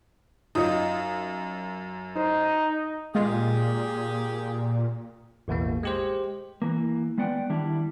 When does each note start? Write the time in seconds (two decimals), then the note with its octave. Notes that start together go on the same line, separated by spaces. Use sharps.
0.55 F#2 D#4 F4 D#5
2.16 D#4 C5
3.15 A#2 G#3 F4 G4 G#4
5.48 A1 E2 B2 A#3
5.83 G#3 G4 C5
6.62 E3 A#3
7.18 G#3 B3 D5 F#5 G5
7.49 D#3 G3 D4 E4